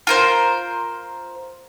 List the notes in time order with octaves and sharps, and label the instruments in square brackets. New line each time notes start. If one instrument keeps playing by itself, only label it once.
[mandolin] F4 A#4 C5